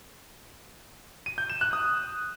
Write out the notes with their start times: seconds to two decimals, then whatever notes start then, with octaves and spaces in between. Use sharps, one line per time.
1.26 D#7
1.38 G6
1.50 E7
1.61 F#6
1.73 D#6